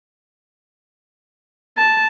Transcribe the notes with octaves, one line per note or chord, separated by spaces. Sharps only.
A5